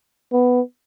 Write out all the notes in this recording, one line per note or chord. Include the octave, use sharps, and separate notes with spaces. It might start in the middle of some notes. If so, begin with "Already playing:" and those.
B3